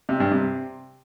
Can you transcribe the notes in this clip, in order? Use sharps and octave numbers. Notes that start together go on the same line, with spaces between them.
C3
G2
C3